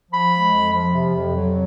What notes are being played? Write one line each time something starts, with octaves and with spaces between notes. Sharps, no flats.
F3 B5
G#3
F2
F3
C3
F2
F#3